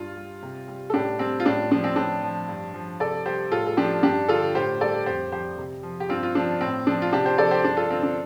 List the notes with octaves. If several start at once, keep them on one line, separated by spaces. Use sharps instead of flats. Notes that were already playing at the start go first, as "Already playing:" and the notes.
Already playing: G2 F4
G3
C3
G3
A4
A2 D4 G4
G3 C4
F4
A2 D4
F3 D4
C4
A2 D4
F3
G2
F3
C3 A4 D5
G3 G4 C5
A2 F4 A4
A4
F3 D4 G4
G2 D4 G4
D3 F4 A4
A2 G4 C5
G3 A4 D5
F2 G4 C5
F3 G4 C5
C3
F3
G4
G2 C4 F4
F4
F3 D4
A2 C4
F3 D4
F4
C3 D4 G4
G4 C5
F3 A4 D5
G4 C5
G2 D4
F4 A4
D3 C4 F4
D4